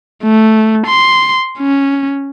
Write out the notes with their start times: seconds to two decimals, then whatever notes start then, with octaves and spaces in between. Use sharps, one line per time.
0.24 A3
0.87 C6
1.59 C#4